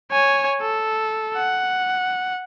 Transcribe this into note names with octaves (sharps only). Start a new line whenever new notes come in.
C#5 G#5
A4
F#5